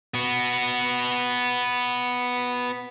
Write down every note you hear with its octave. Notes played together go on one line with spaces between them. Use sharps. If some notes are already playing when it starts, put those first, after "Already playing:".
B3 F#4